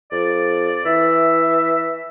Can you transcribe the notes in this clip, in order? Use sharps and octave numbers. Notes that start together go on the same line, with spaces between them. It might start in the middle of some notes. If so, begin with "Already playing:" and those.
F2 D5
E3 E5